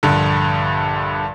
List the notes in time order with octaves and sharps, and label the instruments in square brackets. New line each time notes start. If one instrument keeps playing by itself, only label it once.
[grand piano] A#1 G2 D3